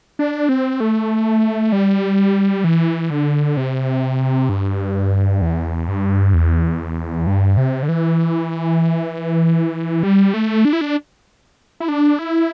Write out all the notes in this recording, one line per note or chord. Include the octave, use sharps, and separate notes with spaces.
D4
C4
A3
G3
E3
D3
C3
G2
E2
G2
E2
G2
C3
D3
E3
G3
A3
D4
E4
D4
E4
D4
E4